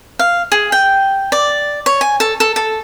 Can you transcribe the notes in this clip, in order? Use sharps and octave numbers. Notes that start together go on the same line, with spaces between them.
F5
G#4
G5
D5
C#5
G#5
A4
A4
A4